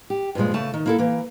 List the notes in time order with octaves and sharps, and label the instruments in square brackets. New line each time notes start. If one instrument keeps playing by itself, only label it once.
[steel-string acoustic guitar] G4
G2 A#2 F3 G#3
C#3 A3 A5
D#3
A#3 E4 A4
E3 A#3